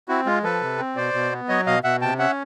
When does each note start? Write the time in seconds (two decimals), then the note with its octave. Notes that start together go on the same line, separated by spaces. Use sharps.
0.08 C4 E4 F#4
0.26 G#3 F4
0.43 F3 A4 B4
0.62 C3
0.79 C4
0.96 B2 C5 D5
1.14 B2
1.32 B3
1.49 F#3 C#5 D#5
1.66 B2 D#5 F5
1.84 B2 E5 F#5
2.01 C3 G5 A5
2.18 C#4 E5 F#5